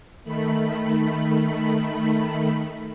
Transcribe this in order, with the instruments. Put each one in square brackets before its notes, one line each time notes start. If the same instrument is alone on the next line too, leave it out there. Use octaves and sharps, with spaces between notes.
[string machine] D#3 A3 B5